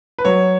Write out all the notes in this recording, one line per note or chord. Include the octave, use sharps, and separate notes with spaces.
B4
F#3 C#5